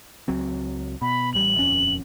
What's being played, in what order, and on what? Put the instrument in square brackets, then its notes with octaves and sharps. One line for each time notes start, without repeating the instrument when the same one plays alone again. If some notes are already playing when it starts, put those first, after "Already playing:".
[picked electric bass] C#2 F#3 C4
[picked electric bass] B2 [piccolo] B5
[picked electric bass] A1 G3 [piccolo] F#7
[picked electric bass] D#1 F2 C#4